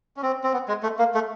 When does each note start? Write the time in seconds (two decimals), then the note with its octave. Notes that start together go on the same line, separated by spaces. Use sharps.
0.16 C#4
0.23 C4
0.43 C4
0.53 B3
0.68 G#3
0.83 A3
0.99 A#3
1.15 A3